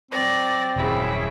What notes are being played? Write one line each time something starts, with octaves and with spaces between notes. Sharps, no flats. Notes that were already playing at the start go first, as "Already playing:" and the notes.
F#3 C4 D5 A#6
D#1 F#2 C#3 E4